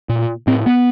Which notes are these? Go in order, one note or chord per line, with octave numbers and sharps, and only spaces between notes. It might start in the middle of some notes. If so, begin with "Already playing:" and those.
A#2
A2 C4
B3